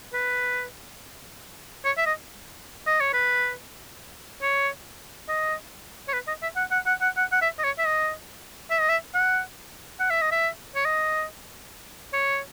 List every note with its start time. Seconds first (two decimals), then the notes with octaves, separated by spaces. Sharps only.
0.13 B4
1.85 C#5
1.98 E5
2.06 D#5
2.87 D#5
3.00 C#5
3.13 B4
4.42 C#5
5.29 D#5
6.08 C#5
6.13 B4
6.28 D#5
6.43 E5
6.56 F#5
6.71 F#5
6.86 F#5
7.01 F#5
7.17 F#5
7.32 F#5
7.42 E5
7.59 D#5
7.64 C#5
7.79 E5
7.85 D#5
8.71 E5
8.80 D#5
8.89 E5
9.14 F#5
10.00 F#5
10.10 E5
10.22 D#5
10.32 E5
10.75 C#5
10.85 D#5
12.13 C#5